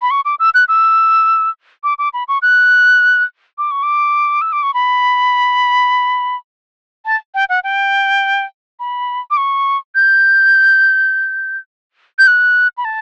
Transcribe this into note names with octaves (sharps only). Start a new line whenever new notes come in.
B5
C#6
D6
E6
F#6
E6
D6
D6
B5
C#6
F#6
D6
C#6
D6
E6
D6
C#6
B5
A5
G5
F#5
G5
B5
D6
C#6
G6
G6
F#6
B5
A5